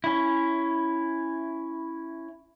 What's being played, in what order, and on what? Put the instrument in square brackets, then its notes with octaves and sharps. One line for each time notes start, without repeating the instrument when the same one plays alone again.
[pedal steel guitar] C#4 E4